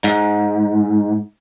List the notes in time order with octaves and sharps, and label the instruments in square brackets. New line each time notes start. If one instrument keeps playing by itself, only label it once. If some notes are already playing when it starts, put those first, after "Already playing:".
[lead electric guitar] G#2